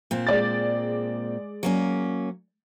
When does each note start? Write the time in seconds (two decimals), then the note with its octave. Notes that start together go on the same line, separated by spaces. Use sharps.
0.11 A#2 C4
0.27 G#3 D5 A6
1.63 F#3 A#3 C#4